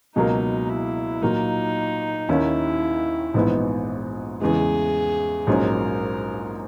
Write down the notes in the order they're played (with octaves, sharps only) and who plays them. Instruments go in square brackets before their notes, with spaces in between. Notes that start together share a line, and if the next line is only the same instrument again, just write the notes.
[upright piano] C#2 B2 F#3 A#3 [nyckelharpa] D#4
[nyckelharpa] E4
[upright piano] A#2 F#3 A#3 [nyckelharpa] D#4
[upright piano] D#2 D#3 A#3 C#4 [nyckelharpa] E4
[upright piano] A#1 G#2 E3 B3 D#4
[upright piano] E2 C#3 E3 G#3 [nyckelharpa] G#4
[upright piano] A#1 G#2 F#3 C#4 [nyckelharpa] A#4